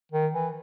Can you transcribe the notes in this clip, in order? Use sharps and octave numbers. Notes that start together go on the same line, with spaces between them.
D#3
E3